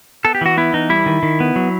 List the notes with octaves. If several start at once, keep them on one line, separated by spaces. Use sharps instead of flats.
B3 A4
G4
E3 F#4
B3 E4
E3 D#4
G3 E4
D#3
D#3
B3
F#3